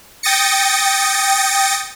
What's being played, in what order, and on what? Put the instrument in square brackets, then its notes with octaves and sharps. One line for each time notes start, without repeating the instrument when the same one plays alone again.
[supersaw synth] G5 D#6 A6 A#6 C#7